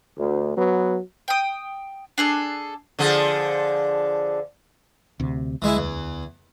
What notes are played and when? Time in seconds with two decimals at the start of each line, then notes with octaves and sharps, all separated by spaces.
0.18 D2
0.57 F#3 B3
1.28 G5 D#6
2.18 D4 G#4 A4
2.99 D3 F3 G#4
5.20 D2 C3
5.62 D2 E3 G#3 E4
5.77 E2